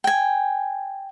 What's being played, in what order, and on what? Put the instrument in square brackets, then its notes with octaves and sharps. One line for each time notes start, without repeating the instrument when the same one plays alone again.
[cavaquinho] G5 G#5